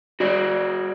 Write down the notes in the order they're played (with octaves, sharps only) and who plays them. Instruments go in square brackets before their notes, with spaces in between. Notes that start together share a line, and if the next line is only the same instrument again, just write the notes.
[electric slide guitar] F#4 G#4 D5